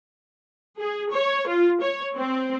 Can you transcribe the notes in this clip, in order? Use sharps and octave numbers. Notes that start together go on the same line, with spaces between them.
G#4
C#5
F4
C#5
C4